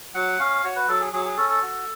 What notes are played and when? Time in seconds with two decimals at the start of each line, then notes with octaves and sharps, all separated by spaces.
0.15 F#3 F#5
0.39 C#4 F5
0.64 F#4 C#5
0.76 B4
0.88 F#3 A4
1.01 G#4
1.13 F#3 G#4
1.25 G#4
1.37 C#4 A4
1.49 A4
1.62 F#4